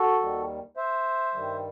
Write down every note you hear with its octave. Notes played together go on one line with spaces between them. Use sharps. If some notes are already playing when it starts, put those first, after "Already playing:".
Already playing: F#4 A4
D#2 D#3 G3
C5 E5
G2 D#3 G3